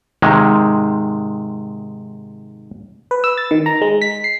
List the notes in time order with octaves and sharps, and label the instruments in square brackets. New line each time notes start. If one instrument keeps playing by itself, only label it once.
[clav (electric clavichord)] G#2 C3 D#3 G#3
[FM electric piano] B4
E6
A6
D#3
A#5
G#3
B6
C7